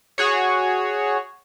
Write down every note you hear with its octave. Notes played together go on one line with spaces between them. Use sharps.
F#4 G#4 C#5